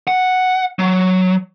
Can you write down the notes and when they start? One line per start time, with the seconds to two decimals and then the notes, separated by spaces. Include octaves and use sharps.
0.08 F#5
0.79 F#3